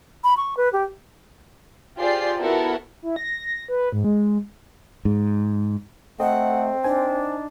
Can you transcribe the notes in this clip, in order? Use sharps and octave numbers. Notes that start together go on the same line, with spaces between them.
B5
C#6
B4
G4
F4 G4 G#4 C5 D5 C7
B3 E4 F#4 A4 A#4
E4
A#6
B4
G#2
G#3
G#2
A3 C4 A4 D#5 F#5
D4 D#4 C5 G#5